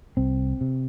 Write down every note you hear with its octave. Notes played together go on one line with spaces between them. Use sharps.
C2 C4
C3